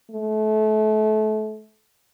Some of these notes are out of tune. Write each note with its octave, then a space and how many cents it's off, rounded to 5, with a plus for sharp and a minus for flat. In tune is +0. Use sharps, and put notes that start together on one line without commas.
A3 -30